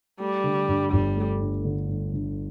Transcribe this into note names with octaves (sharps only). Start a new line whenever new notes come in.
G3 A3
D3
G2
G1 G3
A3
G2
D3
G2
D3